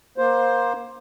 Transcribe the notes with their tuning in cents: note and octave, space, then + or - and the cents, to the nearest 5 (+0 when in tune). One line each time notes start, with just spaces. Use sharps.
A#3 +25 C5 +10